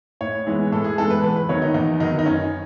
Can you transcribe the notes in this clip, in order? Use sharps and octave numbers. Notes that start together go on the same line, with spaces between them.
A2 C#5
E3 G#3 B3
A2 A4
G#4
E3 G#3 B3 A4
B4
E2 B4
B4
D#3 F#3 B3 C#5
D#4
E2 D#4
D#3 F#3 B3 D#4
D#4
F#2 C#4